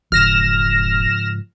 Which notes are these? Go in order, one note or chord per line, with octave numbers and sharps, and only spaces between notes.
E1 G#2 C#3 F3 F6 A#6 E7